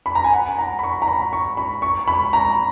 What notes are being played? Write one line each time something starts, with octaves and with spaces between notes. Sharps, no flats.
B5
A#5
G#5
F#5
A#5
B5
C#6
A#5
B5
C#6
B5
C#6
B5
A#5